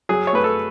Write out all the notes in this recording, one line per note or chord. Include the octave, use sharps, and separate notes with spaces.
F#3 G#4
C#5
A3 B4
A4